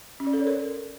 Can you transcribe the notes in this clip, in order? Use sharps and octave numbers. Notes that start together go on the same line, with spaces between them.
C#4
D5
A4
C#5
A#4